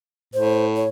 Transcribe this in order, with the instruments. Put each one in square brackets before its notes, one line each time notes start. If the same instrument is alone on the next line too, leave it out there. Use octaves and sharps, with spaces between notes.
[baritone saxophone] A2 [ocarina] C5
[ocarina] C#5